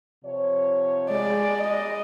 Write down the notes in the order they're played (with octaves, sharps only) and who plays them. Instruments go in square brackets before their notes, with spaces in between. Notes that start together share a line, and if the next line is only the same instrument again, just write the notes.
[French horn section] C3 F3 C#5
[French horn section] G#3 [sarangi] D5
[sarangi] D#5